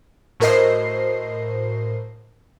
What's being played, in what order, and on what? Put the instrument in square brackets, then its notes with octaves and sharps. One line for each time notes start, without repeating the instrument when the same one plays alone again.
[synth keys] A2 F#4 A#4 C5 D#5 C7